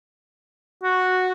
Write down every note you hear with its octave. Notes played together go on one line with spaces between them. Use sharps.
F#4